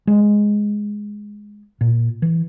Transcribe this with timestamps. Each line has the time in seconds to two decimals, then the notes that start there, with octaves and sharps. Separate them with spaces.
0.07 G#3
1.81 A#2
2.22 E3